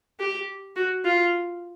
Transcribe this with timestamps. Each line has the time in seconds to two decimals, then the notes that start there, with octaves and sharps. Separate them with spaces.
0.20 G4
0.76 F#4
1.05 F4